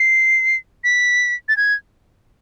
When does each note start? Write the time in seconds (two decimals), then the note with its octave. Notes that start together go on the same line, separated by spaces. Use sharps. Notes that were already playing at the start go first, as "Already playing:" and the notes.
Already playing: C7
0.84 B6
1.48 A6
1.57 G#6